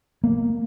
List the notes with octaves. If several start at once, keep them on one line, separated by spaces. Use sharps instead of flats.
A#3